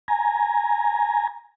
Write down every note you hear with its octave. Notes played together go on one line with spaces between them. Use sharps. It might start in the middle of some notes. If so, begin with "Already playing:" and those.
G#5 A#5